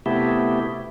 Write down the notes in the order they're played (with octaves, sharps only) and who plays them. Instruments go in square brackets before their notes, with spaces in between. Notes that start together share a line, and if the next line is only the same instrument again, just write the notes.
[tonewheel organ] C3 A3 B3 E4 G4